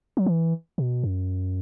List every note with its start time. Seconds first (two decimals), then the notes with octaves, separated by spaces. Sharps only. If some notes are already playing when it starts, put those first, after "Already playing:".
0.17 F#3
0.26 E3
0.78 B2
1.04 F#2